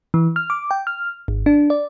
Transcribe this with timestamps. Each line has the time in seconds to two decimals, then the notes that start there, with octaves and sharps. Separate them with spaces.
0.14 E3
0.36 F6
0.50 D6
0.71 G5
0.87 F6
1.28 G#1
1.46 D4
1.70 D5